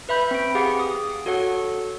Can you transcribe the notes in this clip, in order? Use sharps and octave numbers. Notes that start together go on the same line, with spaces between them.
B4 E5 B5 G6
C4 D7
G4 G#4 F5 F#5
D#6
F#4 A4 C#5 F#5